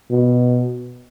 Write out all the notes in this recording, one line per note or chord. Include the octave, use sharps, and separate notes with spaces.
B2